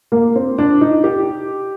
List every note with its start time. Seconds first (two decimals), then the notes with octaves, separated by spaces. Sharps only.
0.12 A#3
0.36 C4
0.58 D4
0.81 D#4
1.04 G4